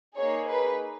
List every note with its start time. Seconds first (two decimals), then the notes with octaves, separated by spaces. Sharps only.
0.17 A#3 D#4 G#4 C#5
0.49 B4